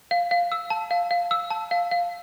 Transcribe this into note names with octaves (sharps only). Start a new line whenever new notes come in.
F5
F5
E6
A5
F5
F5
E6
A5
F5
F5